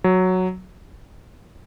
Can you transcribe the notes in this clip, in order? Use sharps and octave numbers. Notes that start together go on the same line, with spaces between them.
F#3